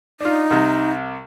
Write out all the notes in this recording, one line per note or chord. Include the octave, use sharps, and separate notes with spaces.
D4 D#4 F4
C2 C3